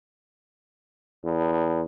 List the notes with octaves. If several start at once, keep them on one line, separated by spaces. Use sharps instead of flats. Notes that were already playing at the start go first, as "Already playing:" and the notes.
E2